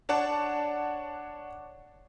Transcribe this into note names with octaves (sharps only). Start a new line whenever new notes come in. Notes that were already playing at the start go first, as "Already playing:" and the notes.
D4 C#5 D5 F#5 A5